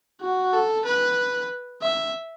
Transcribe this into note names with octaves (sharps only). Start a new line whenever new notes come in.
F#4
A4
B4
E5